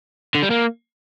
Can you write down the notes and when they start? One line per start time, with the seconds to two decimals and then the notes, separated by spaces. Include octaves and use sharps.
0.35 D3
0.43 G3
0.50 A#3